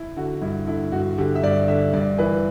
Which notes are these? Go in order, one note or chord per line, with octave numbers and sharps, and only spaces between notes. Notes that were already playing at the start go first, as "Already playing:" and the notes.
Already playing: E4
D3 F#4
G2 E4
D3 E4
G2 F#4
D3 G4
E5
G2 D5
D3 E5
G2 D5
E3 B4